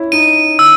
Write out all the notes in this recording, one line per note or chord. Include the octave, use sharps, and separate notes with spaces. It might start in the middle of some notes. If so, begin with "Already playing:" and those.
Already playing: C#4 E4
D#4 D#7
E6